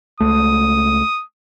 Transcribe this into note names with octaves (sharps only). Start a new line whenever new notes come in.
C#2 A3 D#6